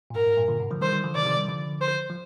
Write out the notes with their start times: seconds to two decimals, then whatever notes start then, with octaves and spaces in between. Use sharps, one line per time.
0.10 A#2
0.15 G#2 A#4
0.26 G#2
0.37 G2 A#2
0.48 A#2 D3
0.60 G#2 C3
0.70 D3 F3
0.81 D#3 G3 C5
0.93 D#3 G3
1.03 D3 F3
1.15 C3 D#3 D5
1.22 F3
1.25 C3 D#3
1.36 D#3 G3
1.48 D3 F3
1.81 C5
2.10 F3